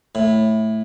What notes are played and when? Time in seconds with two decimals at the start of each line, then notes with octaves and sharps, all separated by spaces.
0.15 A2